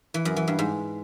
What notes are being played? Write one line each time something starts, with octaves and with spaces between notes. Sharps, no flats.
E3
F#2
E3
G2
G#2